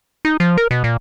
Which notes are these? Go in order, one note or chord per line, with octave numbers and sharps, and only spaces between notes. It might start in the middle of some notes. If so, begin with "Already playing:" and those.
D#4
F3
A#4
B2
A#2